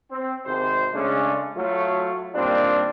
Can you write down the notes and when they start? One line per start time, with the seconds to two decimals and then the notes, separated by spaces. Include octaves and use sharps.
0.11 C4
0.46 G#1 C3 C5
0.94 C#3 G#3 A3 C#4 D4
1.57 F#3 A3 F4
2.35 A#2 D#3 G3 C4 D4 F4